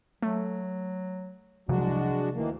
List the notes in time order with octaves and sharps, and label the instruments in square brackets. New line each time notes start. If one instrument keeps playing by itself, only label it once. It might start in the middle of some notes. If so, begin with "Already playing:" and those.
[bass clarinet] F#3 [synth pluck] A3
[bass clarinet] C2 [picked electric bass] C3 F3 F#3 [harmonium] G#3 D4 F#4
[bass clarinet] D2 [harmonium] D#3 E3 A#3